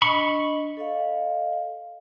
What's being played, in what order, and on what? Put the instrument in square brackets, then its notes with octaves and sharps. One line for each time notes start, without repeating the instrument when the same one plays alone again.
[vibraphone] D4 D#5 [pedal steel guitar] B5 C#6
[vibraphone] A4 D#5 F5